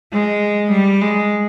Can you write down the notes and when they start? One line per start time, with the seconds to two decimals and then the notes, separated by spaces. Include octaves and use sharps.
0.12 G#3
0.72 G3
1.01 G#3